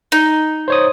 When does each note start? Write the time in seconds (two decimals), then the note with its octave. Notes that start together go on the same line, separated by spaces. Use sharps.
0.12 D#4
0.68 C5 C#5 D#6